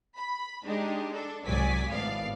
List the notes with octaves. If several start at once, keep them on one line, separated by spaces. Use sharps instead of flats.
B5
G#3 D4 D#4 G4
D4 A4
C2 G#2 F#3 D5 G#5 B6
G#1 A2 B3 D5 F5